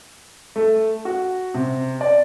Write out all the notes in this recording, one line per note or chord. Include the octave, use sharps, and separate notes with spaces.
A3
F#4
C3
D5